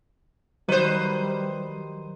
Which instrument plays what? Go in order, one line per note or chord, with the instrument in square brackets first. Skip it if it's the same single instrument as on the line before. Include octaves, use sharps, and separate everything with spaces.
[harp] D#3 [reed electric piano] F#3 [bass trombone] G3 [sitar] B4 C5